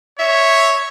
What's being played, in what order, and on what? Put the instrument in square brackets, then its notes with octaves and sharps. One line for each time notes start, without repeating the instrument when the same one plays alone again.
[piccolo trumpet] C#5 [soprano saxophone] E5